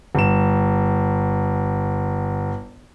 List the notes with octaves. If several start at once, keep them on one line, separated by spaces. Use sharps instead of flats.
G1 E7